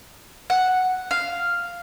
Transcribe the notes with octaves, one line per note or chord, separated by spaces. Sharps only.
F#5
F5